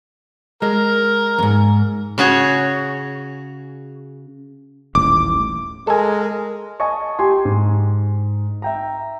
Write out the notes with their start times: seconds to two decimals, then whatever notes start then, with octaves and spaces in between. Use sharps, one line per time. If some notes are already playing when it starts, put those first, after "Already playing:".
0.62 G#3 A#4
1.38 F2 G#2
2.18 C#3 F#4 G#4 C#5
4.95 D#1 A1 D6
5.87 G#3 A4 A#4 G#5
6.80 D#5 G#5 A5 C#6
7.19 G4 G#5 C6
7.45 G#2
8.62 E5 G5 A#5